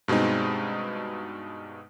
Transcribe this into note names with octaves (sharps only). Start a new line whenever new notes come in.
G2 B2 G#3 C4 D#4